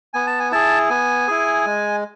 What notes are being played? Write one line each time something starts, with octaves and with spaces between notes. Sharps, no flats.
B3 G#5
A5
G#5
E4 G#4 A5
B3 G#5
E4 G#4
G#3